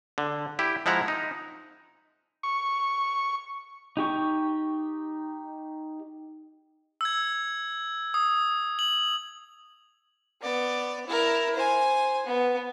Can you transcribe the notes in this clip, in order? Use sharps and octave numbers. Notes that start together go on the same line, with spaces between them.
D3
E4 G4
F3 G#3 E4 F#5 A#5
D#4
C#6
D#4 G4 C#6
E6 G#6
D#6
F#7
B3 D5
E4 A#4
C5 G#5
B3